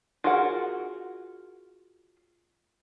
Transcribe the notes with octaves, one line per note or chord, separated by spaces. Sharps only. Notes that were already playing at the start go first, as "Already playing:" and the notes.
F4 F#4 G#4 A#4 F#5